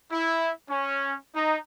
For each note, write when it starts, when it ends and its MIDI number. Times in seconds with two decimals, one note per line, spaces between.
0.12 0.51 64
0.70 1.15 61
1.35 1.57 63